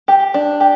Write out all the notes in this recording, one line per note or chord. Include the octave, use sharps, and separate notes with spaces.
G4
D4
G4